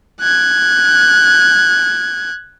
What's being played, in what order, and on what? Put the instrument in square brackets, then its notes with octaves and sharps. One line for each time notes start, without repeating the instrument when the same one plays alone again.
[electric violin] F#6 G#6